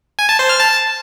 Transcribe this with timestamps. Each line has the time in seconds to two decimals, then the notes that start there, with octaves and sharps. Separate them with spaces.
0.19 G#5
0.29 A5
0.39 C5
0.49 F6
0.60 A5